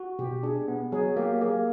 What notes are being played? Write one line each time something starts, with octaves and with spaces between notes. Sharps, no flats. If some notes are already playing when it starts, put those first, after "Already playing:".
Already playing: F#4
B2 G4
D4 G#4
B3
F#3 G#4
A#3 G4
A#3 G#4